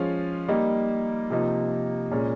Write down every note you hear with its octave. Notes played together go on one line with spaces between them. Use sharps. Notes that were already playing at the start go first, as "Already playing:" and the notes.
Already playing: F3 G#3 C#4 F4
G3 A#3 D#4
C3 F3 A#3 D#4
A#2 G#3 C#4